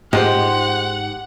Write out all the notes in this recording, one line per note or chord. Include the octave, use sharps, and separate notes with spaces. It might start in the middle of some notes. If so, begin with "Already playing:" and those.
G#2 G#3 F4 G4 C5 F#5